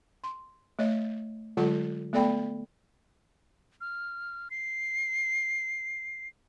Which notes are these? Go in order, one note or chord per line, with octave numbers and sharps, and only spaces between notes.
C6
A3 C#5 D#5
D3 F#3 G#3 F4 A4 F#5
A3 B3 A4 D5 G5 B5
F6
C7